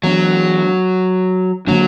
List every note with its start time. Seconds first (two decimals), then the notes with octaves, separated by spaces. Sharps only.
0.04 E3 F#3 B3 D4
1.67 D3 F#3 A#3 D4